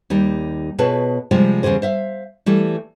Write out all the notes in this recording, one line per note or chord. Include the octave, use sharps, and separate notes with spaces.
D#2 G3 D#4
B2 F4 G#4 B4 C#5 A5
C3 F3 G3 G#3 C5
E2 C#3 G3 G#4 C5
C5 E5 F5
E3 G3 A3